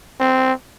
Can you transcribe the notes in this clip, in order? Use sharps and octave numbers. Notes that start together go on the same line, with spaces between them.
C4